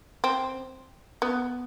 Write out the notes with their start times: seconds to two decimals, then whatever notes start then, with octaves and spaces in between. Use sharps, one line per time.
0.24 C4
1.22 B3